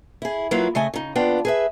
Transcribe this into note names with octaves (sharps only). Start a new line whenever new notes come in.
E4 G#4
F#3 A#3 E4 F4 B4
C#3 A3 D#5 G#5
C#3 D#4
D#2 B3 D4 F4 G5
G#4 B4 E5